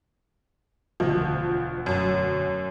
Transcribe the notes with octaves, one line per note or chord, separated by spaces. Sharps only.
E1 D2 F3 D#5
F#2